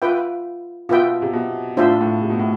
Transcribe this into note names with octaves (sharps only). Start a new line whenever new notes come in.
F4 B4 E5 G5
B2 F4 B4 E5 G5
C3
B2
A2 D4 F4 C5 E5
A2
C3
B2
A2